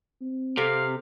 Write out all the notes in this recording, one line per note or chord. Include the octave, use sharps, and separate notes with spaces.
C4
C3 A4 F5 C#7 D7